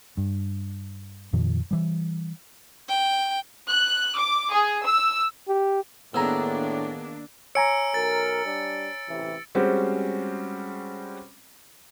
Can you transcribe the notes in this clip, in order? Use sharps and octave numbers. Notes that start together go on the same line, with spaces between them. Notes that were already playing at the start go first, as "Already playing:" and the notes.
G2
F2 A#2 D#3 F3
E3 G3
G5
F#6
D6
G#4
E6
G4
A2 D#3 A#3 B3 D4 G#4 A#5 E6
C#5 G#5 A#5 E6 C#7 D7
B1 A#4 A6
G3 D4
A1 C3 E3
G3 G#3 C4 C#4 F#4 C5